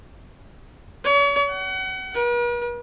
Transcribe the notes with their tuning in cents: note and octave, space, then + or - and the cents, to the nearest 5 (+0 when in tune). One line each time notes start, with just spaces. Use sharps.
C#5 +40
F#5 +35
B4 -45